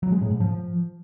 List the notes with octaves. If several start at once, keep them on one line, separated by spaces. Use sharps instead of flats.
F#3
G#3
A2
G#2
F3